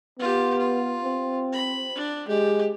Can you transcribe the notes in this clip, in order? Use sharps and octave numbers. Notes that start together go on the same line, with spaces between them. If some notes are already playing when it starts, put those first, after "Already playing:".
B3 F4 G4
F4
C4
B5
D4
G#3 G4